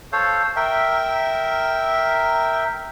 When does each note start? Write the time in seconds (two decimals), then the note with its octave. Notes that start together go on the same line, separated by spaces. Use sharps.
0.12 A4 C5 C#5 F5
0.56 A#4 E5 G5